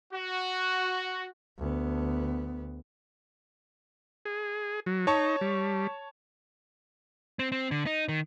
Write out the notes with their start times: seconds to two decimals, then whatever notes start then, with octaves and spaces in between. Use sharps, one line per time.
0.13 F#4
1.59 D2 B3
4.25 G#4
4.86 F#3
5.07 D#4 C#5 A5 C#6
5.41 G3
7.39 C4
7.52 C4
7.71 D3
7.86 D#4
8.09 D#3